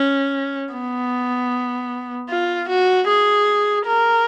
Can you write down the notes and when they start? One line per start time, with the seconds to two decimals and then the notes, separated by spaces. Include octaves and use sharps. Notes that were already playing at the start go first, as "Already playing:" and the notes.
Already playing: C#4
0.74 B3
2.30 F4
2.69 F#4
3.08 G#4
3.87 A#4